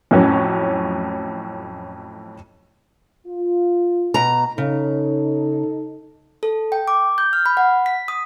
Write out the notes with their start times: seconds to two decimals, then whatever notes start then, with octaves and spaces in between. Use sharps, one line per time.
0.11 F2 A2 F#3 C#4
3.27 F4
4.14 B2 A#5
4.58 C#3 D#4 A4
6.43 A4
6.72 G5
6.88 D6
7.18 G6
7.33 F6
7.46 B5
7.57 F#5
7.86 B6
8.08 D#6